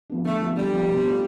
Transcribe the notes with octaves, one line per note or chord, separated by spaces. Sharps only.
F3 B3 D4
D3 A3
F3 B3 D4
D3 G3
F3 B3 D4
B2
A3 D4 F4